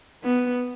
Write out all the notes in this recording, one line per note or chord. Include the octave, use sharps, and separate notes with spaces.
B3